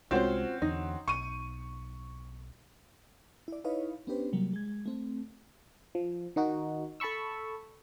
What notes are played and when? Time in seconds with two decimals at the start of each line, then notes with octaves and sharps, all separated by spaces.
0.11 C2 G#3 C4 C#4 F4 F#4 C5
0.62 E2 D3 D#4
1.08 B1 C#6 D#7
3.48 E4 D5
3.64 D#4 E4 B4 C#5 D#5 F5
4.07 B3 C#4 D4 G4 B4 C5
4.33 C3 F#3 G3 A#3
4.53 G#3 G#6
4.86 A3 C4
5.95 F3
6.36 D#3 D#4 F#4
7.00 A4 A5 B5 C#6 E6